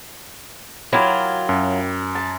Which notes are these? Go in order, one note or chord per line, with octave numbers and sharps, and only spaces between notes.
F#3 E4 F4 G4 A#4
F#2
A5